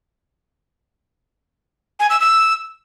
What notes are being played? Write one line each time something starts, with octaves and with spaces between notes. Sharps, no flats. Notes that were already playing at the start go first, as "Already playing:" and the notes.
G#5
E6
E6